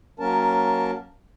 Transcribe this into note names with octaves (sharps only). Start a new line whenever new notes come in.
F#3 A#3 C#4 A#4 A5